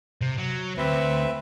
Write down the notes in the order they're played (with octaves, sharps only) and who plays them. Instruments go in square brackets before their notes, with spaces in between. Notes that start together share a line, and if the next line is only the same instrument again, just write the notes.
[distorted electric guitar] C3
F#3
[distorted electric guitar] D2 [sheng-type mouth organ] C4 B4 E5